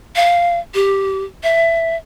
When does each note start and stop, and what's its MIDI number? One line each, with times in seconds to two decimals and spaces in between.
0.16 0.60 77
0.74 1.24 67
1.43 1.96 76